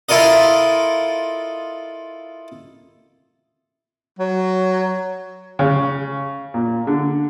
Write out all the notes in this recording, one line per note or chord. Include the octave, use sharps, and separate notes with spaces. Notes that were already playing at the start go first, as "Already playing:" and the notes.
E4 F4 A4 A#4 D#5
F#3
C#3
A#2
D3